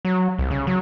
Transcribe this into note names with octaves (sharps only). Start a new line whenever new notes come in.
F#3
C2
C#3
F#3